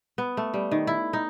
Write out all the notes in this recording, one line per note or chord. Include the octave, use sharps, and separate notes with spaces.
B3
A3
G3
D#3
E4
D#4